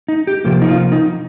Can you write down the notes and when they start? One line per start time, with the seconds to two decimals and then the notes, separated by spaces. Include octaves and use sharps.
0.08 D#4
0.27 G4
0.44 C3 F3 A#3 G4
0.62 D#4
0.69 F4
0.92 D#4